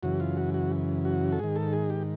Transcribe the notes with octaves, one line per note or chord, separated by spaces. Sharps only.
F#2 C#3 E3 F#4
F4
F#4
F#4
F#4
A4
G#2 D#3 G#4
A4
G#4
G4